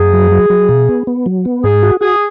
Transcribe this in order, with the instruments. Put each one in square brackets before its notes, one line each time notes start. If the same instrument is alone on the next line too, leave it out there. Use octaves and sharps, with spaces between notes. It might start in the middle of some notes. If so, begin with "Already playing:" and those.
Already playing: [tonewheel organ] F#2 [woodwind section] G#4
[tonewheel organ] F#3
F#3
F#3
B2
B3
B3
F#3
B3
[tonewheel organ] G#2 [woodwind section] G#4
[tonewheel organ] F#4
[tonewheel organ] F#4 [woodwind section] G#4